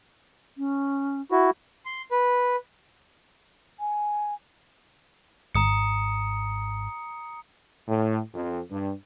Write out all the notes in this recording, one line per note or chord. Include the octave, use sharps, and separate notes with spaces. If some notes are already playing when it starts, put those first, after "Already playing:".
C#4
E4 F#4
C6
B4
G#5
G#1 A#5 D#6 C#7
A2
F2
G2